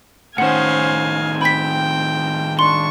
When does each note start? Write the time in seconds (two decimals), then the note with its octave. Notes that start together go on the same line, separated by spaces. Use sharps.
0.38 A2 D#3 C#4 C5 F5 F#5 G#5
1.41 C4 G5 B5 B6
2.59 D4 C6 C#6